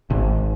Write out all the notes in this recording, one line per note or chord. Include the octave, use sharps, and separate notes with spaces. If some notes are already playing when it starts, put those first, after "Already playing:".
G#1